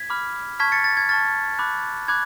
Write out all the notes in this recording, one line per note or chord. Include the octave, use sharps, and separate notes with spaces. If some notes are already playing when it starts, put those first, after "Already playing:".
Already playing: G#6 B6
B5 D6 F6
A5 C#6 F6 G#6 B6
A6 C#7
A6
G#6
A5 C#6 F6 A6
B5 D6 F#6
B5 D6 F#6 G#6